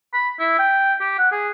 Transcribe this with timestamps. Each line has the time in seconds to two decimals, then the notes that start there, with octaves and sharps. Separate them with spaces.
0.13 B5
0.39 E4
0.59 G5
1.00 G4
1.19 F#5
1.32 G#4